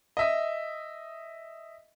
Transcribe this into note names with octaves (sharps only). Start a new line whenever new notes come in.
D#5 E5 D#6